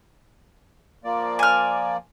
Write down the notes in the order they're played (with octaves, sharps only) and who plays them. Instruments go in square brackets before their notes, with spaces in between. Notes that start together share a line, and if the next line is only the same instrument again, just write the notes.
[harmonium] F3 A#3 D5
[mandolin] G#5 F6